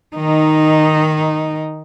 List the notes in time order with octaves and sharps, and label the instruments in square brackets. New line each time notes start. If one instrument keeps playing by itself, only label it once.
[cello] D#3 D#4